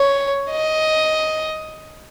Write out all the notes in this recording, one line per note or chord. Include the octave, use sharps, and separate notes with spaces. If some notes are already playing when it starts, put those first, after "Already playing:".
Already playing: C#5
D#5